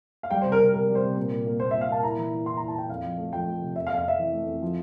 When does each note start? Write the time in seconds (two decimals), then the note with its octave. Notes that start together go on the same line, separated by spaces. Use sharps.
0.23 F5
0.31 G3 G5
0.41 C3 C5
0.52 A#4
0.60 C3
0.74 C3 A#4
0.89 G3
0.95 C5
1.03 C3
1.16 A#2
1.32 A#2
1.46 A#3
1.60 A#2 C5
1.71 A#2 E5
1.81 F5
1.89 A#2 A5
2.03 E4 A#5
2.18 E3
2.32 E4
2.46 E4 C6
2.57 E4 A#5
2.68 A5
2.75 E4 G5
2.89 F2 F5
3.04 F3
3.18 A3
3.33 F3 G5
3.47 A3
3.61 C3
3.76 F2 E5
3.87 F5
3.90 F2
3.97 F5
4.05 F2 E5
4.19 E3
4.33 A3
4.47 F2
4.62 F3